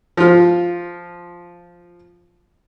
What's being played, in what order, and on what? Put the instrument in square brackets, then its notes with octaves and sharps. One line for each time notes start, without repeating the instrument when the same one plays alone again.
[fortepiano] F3 F4